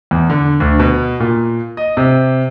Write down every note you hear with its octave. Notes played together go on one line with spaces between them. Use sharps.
E2
D3
D2
B2
A#2
D#5
C3